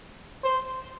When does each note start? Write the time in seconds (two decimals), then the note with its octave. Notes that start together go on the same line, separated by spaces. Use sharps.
0.44 C5